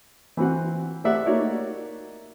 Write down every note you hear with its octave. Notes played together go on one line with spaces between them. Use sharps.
E3 C4 F#4 F#5
A3 G4 C5 D5 E5 F#5
A#3 D#4 F#4 C#5 D5